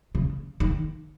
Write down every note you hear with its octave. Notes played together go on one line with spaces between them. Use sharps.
C#3
D#3